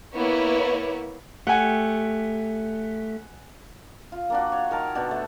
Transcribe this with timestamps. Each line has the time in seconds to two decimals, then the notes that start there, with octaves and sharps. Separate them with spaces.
0.14 A#3 B3 E4 C#5
1.47 A3 G4 F#5 G#5
4.12 F4
4.30 A#3 D4 F#4
4.52 C#5
4.71 D#3 A#4 A5
4.95 B2 D4 F#4
5.11 A3